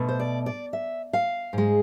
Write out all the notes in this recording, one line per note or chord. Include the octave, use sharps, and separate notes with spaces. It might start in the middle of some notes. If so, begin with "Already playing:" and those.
Already playing: B2 A3
C5
D5
D5
E5
F5
G#2 G#3